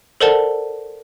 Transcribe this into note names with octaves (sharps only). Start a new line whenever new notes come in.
A4 A#4 C5 D5 F#5 A5